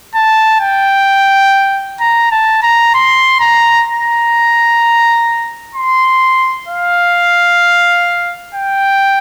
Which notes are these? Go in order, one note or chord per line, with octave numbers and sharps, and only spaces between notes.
A5
G5
A#5
A5
A#5
C6
A#5
A#5
C6
F5
G5